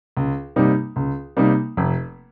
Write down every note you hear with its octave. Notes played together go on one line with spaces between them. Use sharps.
C#2
C3 G3 A#3 D#4
C#2
C3 G3 A#3 D#4
F1